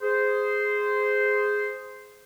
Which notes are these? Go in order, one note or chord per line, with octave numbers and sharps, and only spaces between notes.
G#4 C5